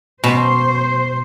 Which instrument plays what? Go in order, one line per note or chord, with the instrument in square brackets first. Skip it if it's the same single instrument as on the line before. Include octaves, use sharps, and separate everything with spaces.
[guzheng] B2 [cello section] C5